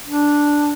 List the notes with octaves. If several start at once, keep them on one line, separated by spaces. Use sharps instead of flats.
D4